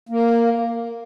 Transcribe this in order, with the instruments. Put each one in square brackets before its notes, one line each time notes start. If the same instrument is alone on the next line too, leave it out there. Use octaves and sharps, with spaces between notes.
[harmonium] A#3